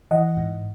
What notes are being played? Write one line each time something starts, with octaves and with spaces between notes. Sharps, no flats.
E3 D#5 F#5
G#2